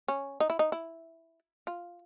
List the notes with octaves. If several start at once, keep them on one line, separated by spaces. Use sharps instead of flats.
C#4
D#4
E4
D#4
E4
F4